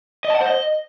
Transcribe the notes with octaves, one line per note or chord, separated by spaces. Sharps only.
D#5
A5
F#5
C5
D#5